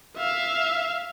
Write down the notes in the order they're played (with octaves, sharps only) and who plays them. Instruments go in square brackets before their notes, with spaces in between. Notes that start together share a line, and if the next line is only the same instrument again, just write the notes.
[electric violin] E5 F5